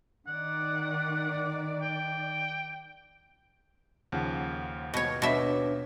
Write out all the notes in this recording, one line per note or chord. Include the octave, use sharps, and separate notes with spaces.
D#3 D5 F#5
G5
D#2 C#3 F3 F#5
B2 C#5
B2 D4 B4 C#5 E5